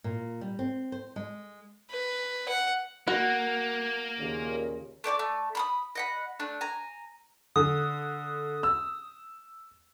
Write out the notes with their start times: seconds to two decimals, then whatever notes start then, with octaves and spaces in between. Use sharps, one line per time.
0.04 A#2
0.41 G3
0.59 C4
0.92 C5
1.16 G#3
1.90 B4
2.48 F#5
3.08 A#3 F#4
4.18 D#2 A#2 C#3
5.04 A3 D5 G5 D6
5.19 A3
5.55 B5 C6 D#6
5.95 D#5 F#5 B5
6.40 A3 D4
6.61 G#5 A#5
7.56 D3 D#6
8.63 E6